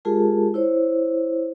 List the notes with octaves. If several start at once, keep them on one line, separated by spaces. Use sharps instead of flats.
G#3 F4 G4 G#4 A#4 A5
E4 C5 C#5